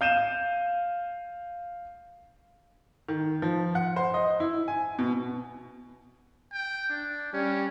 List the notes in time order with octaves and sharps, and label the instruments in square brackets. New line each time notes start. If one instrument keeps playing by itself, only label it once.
[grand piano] F5 G6 D#7 E7
[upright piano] D#3
F3
F#5
C5
D#5
E4
G#5
B2
[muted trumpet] G5
D4
[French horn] G3 [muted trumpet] C#4